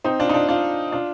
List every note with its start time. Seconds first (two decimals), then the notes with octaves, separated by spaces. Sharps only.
0.04 C4 D#4
0.20 D4 F4
0.29 D#4
0.34 D4 F4
0.49 D4 F4
0.92 D4 F4